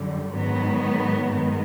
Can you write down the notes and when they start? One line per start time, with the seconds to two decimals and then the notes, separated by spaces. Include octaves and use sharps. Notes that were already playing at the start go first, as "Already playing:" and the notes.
Already playing: F#2 D3 G3
0.33 G#2 D#3 F#3 B3
1.29 G2 D#3 G#3 B3